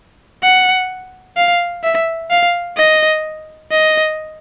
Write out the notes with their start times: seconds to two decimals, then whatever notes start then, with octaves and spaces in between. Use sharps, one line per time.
0.43 F#5
1.37 F5
1.84 E5
2.30 F5
2.77 D#5
3.71 D#5